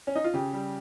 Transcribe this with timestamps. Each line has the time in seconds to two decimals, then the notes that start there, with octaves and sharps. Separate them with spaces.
0.07 C#4
0.15 D#4
0.24 F4
0.34 C#3 G4
0.53 G3